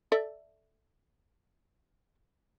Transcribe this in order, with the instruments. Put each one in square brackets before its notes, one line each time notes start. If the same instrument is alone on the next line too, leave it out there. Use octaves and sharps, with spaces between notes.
[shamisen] A4 D5 E5